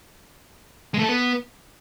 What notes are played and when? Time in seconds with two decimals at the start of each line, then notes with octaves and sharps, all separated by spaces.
0.94 G#3
0.99 A3
1.04 A4
1.09 B3